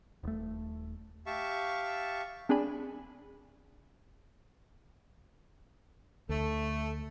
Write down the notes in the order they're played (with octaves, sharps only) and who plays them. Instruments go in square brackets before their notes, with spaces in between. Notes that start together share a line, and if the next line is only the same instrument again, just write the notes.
[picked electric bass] D#1 A3
[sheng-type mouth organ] G4 E5 F5 A5 C#6
[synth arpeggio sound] C4 D4 G#4 D5 G#5 B5
[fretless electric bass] D2 [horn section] A3